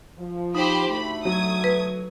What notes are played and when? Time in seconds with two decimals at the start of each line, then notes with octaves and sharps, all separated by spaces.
0.18 F3
0.55 D#4 G4 C5 B5
0.89 D2 A3 B5
1.25 F#3 D#6 G#6
1.64 B4